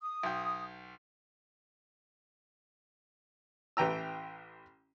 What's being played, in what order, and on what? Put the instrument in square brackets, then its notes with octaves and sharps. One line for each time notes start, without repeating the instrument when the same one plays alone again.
[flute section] D#6
[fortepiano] B1 G5
A1 E3 G5 A#5 E6